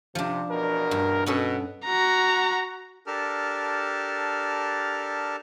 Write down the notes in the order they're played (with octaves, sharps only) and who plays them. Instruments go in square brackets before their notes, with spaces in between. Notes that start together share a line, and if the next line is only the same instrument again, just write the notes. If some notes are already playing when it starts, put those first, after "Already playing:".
[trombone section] C3 [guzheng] F3 D4
[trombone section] E2 B2 A#4
[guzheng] G2
[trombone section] B2 [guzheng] B3 C#4 A4
[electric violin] F#4 A#5
[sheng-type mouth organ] D4 G4 A4 A#4 A5 F6